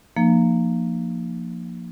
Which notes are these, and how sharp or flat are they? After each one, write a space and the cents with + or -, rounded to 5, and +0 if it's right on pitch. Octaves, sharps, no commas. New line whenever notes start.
F3 +0 A#3 +0 D#4 -35